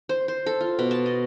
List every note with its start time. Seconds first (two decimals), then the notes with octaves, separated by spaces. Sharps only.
0.09 C5
0.28 C5
0.46 A4
0.60 F4
0.79 B2
0.91 A5
1.06 D#5